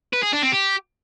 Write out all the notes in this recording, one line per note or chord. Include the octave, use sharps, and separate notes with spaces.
B4
G#4
D4
C4
G4